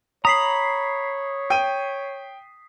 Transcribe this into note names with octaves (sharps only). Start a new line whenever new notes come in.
C#5 A#5 B5 D#6 B6 C7
G5 D#7